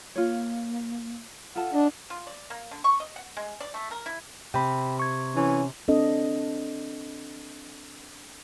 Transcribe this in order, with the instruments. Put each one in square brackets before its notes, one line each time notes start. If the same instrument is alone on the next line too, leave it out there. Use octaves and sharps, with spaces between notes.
[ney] A#3 [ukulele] F4 C#5
[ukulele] F4 A4 A5 [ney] F#5
[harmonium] D4 [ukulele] D#5 A5
[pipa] F4
D5
A#3
D3
C#6
D#5
F#5
G#3
D5
A3
A#4
E4
[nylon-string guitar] C3 [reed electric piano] G5 B5
[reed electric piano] C#6 G#6
[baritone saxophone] E3 [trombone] C#4
[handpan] C4 D4 A4 D#5